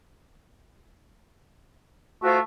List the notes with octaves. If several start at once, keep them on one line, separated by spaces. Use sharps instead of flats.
A3 F4 F#4 C5